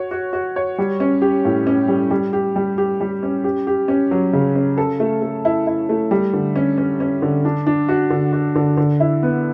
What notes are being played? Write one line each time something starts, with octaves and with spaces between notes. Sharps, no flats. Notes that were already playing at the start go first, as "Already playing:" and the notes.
Already playing: F#4 C#5
F#4
F#4
C#5
G3
C#4
G4
A2
C#4
G3
G3
G4
G3
G4
G3
C#4
G4
G4
C#4
F#3
C#3
C#4
A4
A3
A3
E4
E4
A3
G3
D3
C#4
C#4
C#4
D3
D4
D4
F#4
D3
F#4
D3
D3
E4
B3